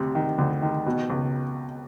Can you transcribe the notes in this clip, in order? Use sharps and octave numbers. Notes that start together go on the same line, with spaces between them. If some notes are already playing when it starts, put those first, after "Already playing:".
Already playing: D2 C3
D#3
D2
D#3
B2
C#2